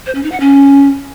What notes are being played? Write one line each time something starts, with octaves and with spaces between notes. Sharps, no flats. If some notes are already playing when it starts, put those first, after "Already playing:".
C5
C#4
D#4
F#5
C#4